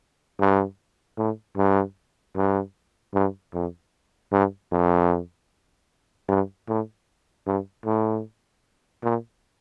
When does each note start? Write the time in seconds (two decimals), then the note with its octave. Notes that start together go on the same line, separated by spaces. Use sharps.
0.40 G2
1.18 A2
1.57 G2
2.36 G2
3.14 G2
3.54 F2
4.32 G2
4.72 F2
6.28 G2
6.68 A2
7.47 G2
7.85 A2
9.03 A#2